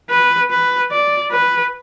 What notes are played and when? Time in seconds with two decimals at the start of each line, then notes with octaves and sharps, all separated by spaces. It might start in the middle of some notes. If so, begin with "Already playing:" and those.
0.10 B4
0.50 B4
0.92 D5
1.32 B4